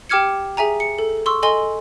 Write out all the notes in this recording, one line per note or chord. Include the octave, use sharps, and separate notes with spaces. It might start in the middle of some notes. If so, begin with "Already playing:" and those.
G4 G5 D6 F6 G#6 C#7
G#4 E5 G#5 A#5
C#7
A4
C6 C#6 E6
A4 D#5 G#5 C6 G7